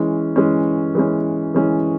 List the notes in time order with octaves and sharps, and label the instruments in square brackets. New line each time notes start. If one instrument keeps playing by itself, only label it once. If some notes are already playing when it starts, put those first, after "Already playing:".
Already playing: [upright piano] E3 G#3 C#4
E3 G#3 C#4
E3 G#3 C#4
E3 G#3 C#4